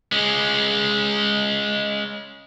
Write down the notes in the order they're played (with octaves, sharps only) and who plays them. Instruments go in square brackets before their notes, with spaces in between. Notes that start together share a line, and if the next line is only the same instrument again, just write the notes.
[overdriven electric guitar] G#3 C#4